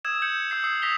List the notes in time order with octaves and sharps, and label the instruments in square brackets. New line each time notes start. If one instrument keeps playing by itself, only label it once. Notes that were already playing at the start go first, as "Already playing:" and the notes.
[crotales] D#6 E6 G#6 E7
G6 C#7 F#7
E6 G#6 C7 F#7
D#6 E6 C7
D#6 E6 A#6 B6 F7 G7